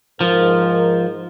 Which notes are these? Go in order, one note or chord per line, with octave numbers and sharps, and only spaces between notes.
G#2 F3 A#4